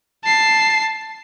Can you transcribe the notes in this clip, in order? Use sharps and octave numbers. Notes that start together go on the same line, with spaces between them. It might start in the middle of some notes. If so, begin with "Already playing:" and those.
A5 C7